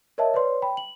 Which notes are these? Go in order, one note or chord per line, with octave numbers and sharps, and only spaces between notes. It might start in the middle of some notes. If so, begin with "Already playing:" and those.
A#4 C#5 D#5 E5 A5
B4 C#5 D5 C6
G5 B5
F#7